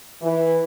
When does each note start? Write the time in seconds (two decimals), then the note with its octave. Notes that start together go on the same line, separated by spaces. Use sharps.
0.21 E3